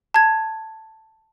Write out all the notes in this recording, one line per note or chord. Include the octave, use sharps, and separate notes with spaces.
A5 G#6